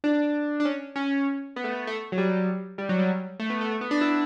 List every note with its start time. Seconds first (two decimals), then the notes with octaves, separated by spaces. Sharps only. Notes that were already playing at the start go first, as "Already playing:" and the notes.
0.04 D4
0.60 D4
0.65 C#4
0.96 C#4
1.56 B3
1.64 A3
1.73 B3
1.87 A3
2.12 F#3
2.18 G3
2.78 G3
2.89 F#3
2.99 G3
3.39 A3
3.50 B3
3.61 A3
3.71 A3
3.81 B3
3.91 D4
4.01 E4